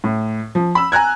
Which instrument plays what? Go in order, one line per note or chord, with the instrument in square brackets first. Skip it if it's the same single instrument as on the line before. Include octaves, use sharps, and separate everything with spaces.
[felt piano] A2
F3
B5 E6
G#5 A#5 F#6 G#6